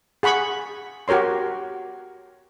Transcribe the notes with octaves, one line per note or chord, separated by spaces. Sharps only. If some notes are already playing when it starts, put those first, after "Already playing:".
G#4 F#5 B5 C#6
F#4 G4 A#4 C#5 C6